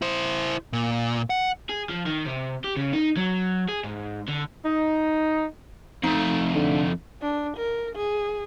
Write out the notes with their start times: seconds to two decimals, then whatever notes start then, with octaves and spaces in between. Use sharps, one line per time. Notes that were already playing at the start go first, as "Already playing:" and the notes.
0.02 E4 C5
0.73 A#2
1.30 F#5
1.69 G#4
1.89 F3
2.06 D#3
2.26 C3
2.64 G4
2.76 C#3
2.93 D#4
3.17 F#3
3.69 G#4
3.84 G#2
4.28 D3
4.65 D#4
6.04 F2 A3 D#4
6.53 D3
7.22 D4
7.57 A#4
7.95 G#4